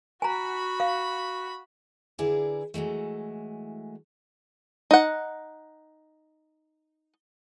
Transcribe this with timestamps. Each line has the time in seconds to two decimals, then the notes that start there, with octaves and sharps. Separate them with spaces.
0.22 F#4 G#5 A#5 B5
0.80 F5
2.18 D3 E4 G#4 A#4 B4 D5
2.74 E3 F#3 G#3 A3
4.91 D#4 F#5